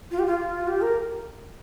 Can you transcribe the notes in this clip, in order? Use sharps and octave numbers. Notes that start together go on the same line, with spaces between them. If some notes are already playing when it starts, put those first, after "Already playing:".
F4
G4
F4
G4
A#4